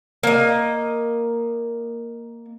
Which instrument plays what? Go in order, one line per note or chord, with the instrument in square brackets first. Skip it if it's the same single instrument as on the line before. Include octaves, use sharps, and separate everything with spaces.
[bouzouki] A#3 D#5